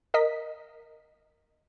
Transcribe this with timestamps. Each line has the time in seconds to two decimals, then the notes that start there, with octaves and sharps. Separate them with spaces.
0.14 A#4 D#5 B6